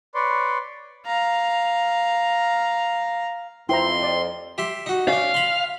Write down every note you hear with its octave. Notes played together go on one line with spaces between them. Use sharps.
B4 C#5 D5 C6
F5 A#5
F2 E4 C5 G5 A#5 C6
D5
G4 E5 C6
D#4 F#4
C#4 D4 F5
B5 C6